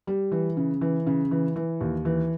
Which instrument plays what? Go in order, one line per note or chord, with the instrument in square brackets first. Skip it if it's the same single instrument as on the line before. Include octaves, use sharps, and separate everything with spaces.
[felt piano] G3
E3
C#3
E3
C#3
E3
E3
D#2
E3